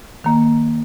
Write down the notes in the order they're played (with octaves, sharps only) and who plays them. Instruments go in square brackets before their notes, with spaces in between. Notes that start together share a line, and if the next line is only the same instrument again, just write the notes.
[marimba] D#3 A#3